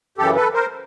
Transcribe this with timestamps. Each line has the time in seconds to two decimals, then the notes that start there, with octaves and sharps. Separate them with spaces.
0.18 F#2 C#3 E3 G4 A4
0.36 A4 B4
0.53 A#4 C5